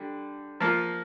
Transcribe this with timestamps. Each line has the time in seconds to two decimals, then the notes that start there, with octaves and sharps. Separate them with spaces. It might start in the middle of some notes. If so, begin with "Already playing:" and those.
Already playing: D3 G3
0.60 F3 A#3 F4